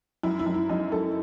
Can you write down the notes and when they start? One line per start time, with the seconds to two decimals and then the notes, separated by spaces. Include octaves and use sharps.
0.23 F#2 E4
0.39 E4
0.46 F#2
0.54 E4
0.69 F#2 D#4
0.92 F#2 A4